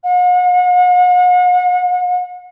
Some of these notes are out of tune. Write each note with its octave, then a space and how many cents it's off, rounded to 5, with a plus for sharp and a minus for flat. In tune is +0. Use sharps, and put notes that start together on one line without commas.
F#5 -45